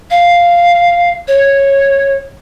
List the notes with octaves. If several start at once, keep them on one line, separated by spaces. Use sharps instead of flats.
F5
C#5